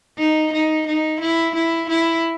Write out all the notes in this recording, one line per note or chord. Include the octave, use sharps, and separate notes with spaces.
D#4
D#4
D#4
E4
E4
E4